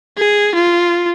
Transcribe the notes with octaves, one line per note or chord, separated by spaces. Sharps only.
G#4
F4